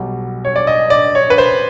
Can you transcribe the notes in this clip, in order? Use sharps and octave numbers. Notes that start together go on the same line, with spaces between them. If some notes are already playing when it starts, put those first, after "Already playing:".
Already playing: B1 B2 G3
C#5
D5
D#5
D5
C#5
B4
C5